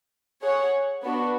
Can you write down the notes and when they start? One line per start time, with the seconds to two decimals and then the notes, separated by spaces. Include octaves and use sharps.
0.42 G#4 C#5 F#5
1.03 B3 D4 F#4